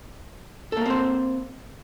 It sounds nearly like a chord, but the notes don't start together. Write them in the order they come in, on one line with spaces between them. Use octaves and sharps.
A4 A#3 A#4 C4 C5